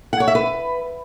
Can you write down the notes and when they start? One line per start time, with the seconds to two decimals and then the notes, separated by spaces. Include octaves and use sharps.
0.13 F#5
0.20 C#5
0.28 E5
0.35 B4